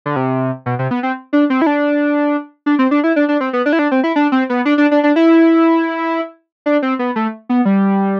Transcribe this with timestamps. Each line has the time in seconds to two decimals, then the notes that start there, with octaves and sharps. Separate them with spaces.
0.06 D3
0.16 C3
0.66 B2
0.79 C3
0.91 B3
1.03 C4
1.33 D4
1.50 C4
1.62 E4
1.66 D4
2.66 D4
2.79 C4
2.91 D4
3.04 E4
3.16 D4
3.29 D4
3.41 C4
3.53 B3
3.66 D4
3.73 E4
3.79 D4
3.91 C4
4.04 E4
4.16 D4
4.32 C4
4.50 B3
4.65 D4
4.78 D4
4.91 D4
5.03 D4
5.16 E4
6.66 D4
6.82 C4
6.99 B3
7.16 A3
7.49 B3
7.65 G3